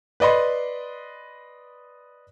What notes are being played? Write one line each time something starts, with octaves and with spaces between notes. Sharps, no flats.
B4 D5 D#5 B5 C6